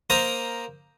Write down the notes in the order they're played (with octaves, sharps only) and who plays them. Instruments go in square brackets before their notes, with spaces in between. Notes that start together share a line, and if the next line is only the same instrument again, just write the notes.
[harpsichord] A#3 A#4 C5 A#5 D#6